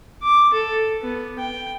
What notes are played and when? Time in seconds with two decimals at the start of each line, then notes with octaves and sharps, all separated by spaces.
0.23 D6
0.53 A4
1.02 B3
1.39 G5